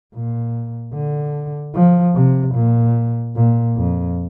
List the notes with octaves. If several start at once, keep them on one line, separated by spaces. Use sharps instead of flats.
A#2
D3
F3
C3
A#2
A#2
F2